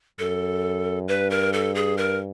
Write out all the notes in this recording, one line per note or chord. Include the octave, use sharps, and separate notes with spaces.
F#2 A4
G2 B4
A#4
A4
G#4
A#4